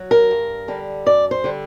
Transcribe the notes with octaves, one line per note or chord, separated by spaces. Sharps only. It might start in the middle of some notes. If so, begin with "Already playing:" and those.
Already playing: F#3
A#4
G2
D3 G3
F#2 D5
C5
D3 G3